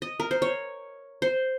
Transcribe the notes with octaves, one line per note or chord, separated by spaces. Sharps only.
D#5
A#4
C5
C#5
C5